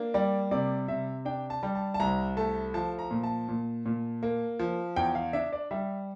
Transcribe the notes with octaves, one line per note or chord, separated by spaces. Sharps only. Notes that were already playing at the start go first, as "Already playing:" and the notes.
Already playing: A#3 D4
G3 D5
C3 D5
C3 E5
D4 G5
A5
G3
A5
A5
C2 A#5
A3 A5
F3 A5
A#5
A#2
A5
A#2
A#2
A#3
F3
E2 G5
F5
D4 E5
D5
G3 E5